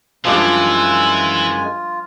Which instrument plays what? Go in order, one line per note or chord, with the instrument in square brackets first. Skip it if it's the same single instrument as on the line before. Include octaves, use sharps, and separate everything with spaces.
[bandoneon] F#2 G#3 G#5 [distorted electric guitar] E3 [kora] F3 G3 D4 [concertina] F4